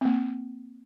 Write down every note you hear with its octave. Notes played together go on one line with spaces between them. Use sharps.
A#3 C4